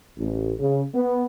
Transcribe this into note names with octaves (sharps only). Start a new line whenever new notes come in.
A1
C#3
B3